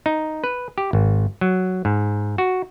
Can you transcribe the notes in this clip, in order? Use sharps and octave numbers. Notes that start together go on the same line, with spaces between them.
D#4
B4
G4
G#1
F#3
G#2
F#4